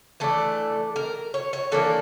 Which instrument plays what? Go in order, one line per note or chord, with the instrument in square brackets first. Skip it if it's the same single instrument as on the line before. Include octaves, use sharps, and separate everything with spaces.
[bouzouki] E3 A3 D4 A4
A#4
C#5
C#5
E3 A#3 D4 A4